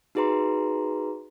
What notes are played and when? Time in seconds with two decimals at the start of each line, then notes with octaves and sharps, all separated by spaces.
0.15 D#4 F#4 G#4 B4 A#5 C6